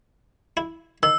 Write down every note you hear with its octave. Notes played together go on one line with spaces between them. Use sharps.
E4
D#3 E6